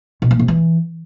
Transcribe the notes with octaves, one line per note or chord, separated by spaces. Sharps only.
B2
A#3
C3
E3